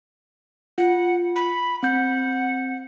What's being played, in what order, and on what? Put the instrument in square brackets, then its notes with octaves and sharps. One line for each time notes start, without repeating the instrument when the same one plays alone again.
[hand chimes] F4 [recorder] F#5
[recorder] B5
[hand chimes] C4 G6 [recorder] F#5